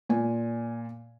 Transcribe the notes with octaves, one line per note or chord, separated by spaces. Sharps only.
A#2 G#5